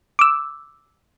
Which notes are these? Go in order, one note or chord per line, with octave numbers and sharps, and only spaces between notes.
D6 E6